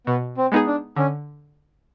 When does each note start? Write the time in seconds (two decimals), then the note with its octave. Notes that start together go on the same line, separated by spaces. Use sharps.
0.07 B2 B3
0.37 C4
0.52 G#3 B3 D#4 G#4
0.67 D4
0.96 D3 C#4